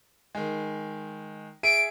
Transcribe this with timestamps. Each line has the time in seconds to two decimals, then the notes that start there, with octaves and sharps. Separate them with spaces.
0.35 D#3 G#3
1.63 G#4 E5 D7 D#7